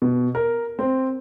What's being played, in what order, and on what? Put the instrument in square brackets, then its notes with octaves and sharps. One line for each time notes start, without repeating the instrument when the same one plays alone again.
[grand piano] B2
A#4
C4